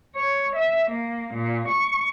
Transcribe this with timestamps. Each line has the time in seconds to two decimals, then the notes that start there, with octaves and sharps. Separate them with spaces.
0.15 C#5
0.56 E5
0.90 A#3
1.34 A#2
1.68 C#6